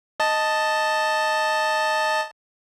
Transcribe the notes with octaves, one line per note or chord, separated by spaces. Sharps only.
D#5 A5